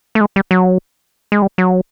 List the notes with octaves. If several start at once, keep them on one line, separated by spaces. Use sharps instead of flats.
A3
G#3
G3
F#3
G#3
G3
F#3